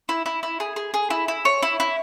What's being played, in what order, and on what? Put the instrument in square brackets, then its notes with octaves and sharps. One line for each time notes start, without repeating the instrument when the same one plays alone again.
[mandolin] E4
E4
E4
G#4
G#4
G#4
E4
E4
C#5
E4
E4